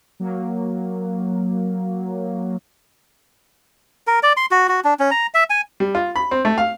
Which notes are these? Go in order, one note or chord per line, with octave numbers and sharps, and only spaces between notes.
F#3 A#3
A#4
D5
C6
F#4
F#4
D4
C#4
A#5
E5
G#5
G3
F4
B5
C4
A3
F5